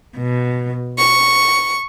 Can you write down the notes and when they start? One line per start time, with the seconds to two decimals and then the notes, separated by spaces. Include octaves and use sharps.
0.17 B2
0.96 C#6